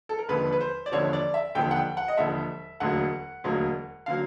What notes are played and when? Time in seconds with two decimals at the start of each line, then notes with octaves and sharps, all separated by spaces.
0.09 A4
0.19 A#4
0.29 E1 D#2 D3 F3 B4
0.52 B4
0.61 C5
0.86 D5
0.92 E1 D#2 D3 F3 C#5
1.13 D5
1.34 E5
1.55 E1 D#2 D3 F3 G5
1.71 F#5
1.76 G5
1.97 F#5
2.08 D#5
2.17 E1 D#2 D3 F3 E5
2.80 E1 D2 D3 F#3 A#3 F#5
3.44 E1 D2 D3 F#3 A#3
4.06 D3 F#3 A#3 F5